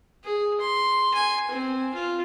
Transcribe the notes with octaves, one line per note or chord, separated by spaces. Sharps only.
G#4
C6
G#5
C4
F4